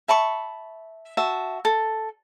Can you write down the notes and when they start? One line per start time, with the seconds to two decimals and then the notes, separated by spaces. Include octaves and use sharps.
0.08 E5 A5 B5 C#6
1.17 F#4 E5 A5
1.65 A4